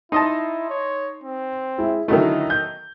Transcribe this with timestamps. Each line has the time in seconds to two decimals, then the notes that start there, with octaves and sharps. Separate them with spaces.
0.12 D#4 E4 D#5 A5 C6
0.70 C#5
1.24 C4
1.78 G#3 E4
2.08 D3 D#3 F#3 A3 D#4 E4 D#5
2.50 G6